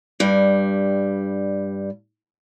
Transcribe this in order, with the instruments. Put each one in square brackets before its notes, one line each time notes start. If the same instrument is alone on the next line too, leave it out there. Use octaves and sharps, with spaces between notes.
[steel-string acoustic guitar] G2 G3